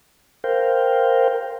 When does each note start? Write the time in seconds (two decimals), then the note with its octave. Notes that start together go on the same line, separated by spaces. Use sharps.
0.44 A#4 C5 F5 G5